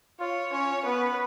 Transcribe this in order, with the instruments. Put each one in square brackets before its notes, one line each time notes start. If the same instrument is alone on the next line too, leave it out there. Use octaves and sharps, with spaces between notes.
[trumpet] F4 [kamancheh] C#5
[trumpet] C#4 [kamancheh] C#5
[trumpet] B3 [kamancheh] B4